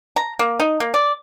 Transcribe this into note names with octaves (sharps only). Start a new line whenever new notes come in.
A#5
A#3
D#4
A#3
D5